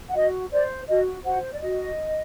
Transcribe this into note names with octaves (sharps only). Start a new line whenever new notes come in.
F#5
F#4 D#5
C5 D5
F#4 D#5
F#4 C5 F#5
D5
F#4 D#5